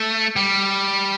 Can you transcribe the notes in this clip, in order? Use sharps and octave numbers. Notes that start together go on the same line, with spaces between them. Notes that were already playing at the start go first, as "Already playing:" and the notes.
Already playing: A3
G3